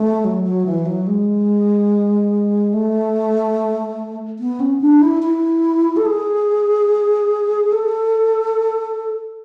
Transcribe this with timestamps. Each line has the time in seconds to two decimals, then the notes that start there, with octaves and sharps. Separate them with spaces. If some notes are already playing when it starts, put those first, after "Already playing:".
Already playing: A3
0.24 F#3
0.44 F#3
0.66 E3
0.86 F#3
1.07 G#3
2.73 A3
4.39 B3
4.60 C#4
4.81 D4
5.01 E4
5.23 E4
5.97 A4
6.06 G#4
7.72 A4